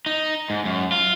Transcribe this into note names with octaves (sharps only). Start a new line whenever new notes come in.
D#4
G#2
F#2
F4